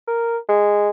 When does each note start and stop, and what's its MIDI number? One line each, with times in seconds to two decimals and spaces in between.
0.07 0.38 70
0.49 0.90 56